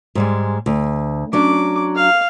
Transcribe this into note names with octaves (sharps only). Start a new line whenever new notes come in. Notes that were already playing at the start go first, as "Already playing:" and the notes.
G#2 G3 G#3
D2
F#3 C#4 D4 D6
F5